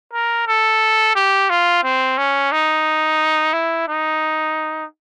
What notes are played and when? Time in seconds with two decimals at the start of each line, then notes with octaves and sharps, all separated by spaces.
0.13 A#4
0.47 A4
1.16 G4
1.50 F4
1.84 C4
2.18 C#4
2.52 D#4
3.53 E4
3.88 D#4